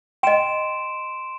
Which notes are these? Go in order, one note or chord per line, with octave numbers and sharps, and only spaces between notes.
D#5 G5 C6 D7 E7